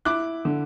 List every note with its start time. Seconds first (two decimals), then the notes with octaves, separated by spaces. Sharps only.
0.05 E4 D6 F#6
0.45 D3